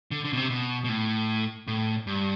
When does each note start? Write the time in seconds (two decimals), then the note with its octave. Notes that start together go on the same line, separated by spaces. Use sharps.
0.11 D3
0.24 D3
0.33 B2
0.37 C3
0.50 B2
0.84 B2
0.89 A2
1.68 A2
2.07 G2